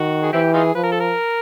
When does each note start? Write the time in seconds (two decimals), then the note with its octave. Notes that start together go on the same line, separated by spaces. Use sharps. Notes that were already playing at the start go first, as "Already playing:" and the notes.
Already playing: D#3 F#4
0.23 G#4
0.33 E3 C4 E4 G4
0.54 D#4 F4 G#4
0.75 F3 B4
0.84 A#4
0.92 A4
1.00 A#4